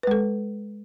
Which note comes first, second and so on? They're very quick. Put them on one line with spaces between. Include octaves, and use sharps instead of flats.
B4 G#3 A4